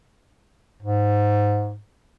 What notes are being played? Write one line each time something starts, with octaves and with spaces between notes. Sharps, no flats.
G#2